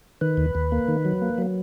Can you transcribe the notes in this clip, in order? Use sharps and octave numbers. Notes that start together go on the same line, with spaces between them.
D#3 B4
D#2
D#2
A#3
D#3
F#3
A#3
F#3